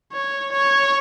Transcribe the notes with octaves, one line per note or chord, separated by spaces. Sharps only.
C#5
C#5